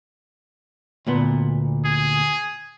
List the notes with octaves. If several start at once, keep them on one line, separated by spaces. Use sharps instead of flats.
D2 A#2 B3
G#4